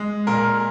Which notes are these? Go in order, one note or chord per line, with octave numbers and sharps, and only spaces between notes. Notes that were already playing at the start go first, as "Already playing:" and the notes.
Already playing: G#3
A#2 A#4